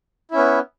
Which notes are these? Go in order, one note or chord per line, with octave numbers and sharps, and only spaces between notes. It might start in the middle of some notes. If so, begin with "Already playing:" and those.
B3 C#4 E4